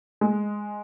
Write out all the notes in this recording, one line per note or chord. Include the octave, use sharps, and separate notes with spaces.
G#3